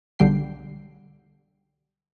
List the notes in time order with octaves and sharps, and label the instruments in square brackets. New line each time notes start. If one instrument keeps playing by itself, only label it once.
[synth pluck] B1 D3 G3 G5 C7